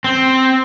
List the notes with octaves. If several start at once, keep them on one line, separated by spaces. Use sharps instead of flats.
C4